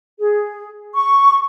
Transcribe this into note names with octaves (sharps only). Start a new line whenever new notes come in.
G#4
C#6